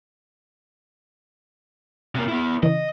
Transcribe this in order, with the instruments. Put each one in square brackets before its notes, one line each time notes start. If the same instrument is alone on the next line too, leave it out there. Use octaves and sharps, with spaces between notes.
[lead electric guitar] C3 A#3
B3 E4
[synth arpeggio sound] C#3 E3 [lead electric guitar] D#5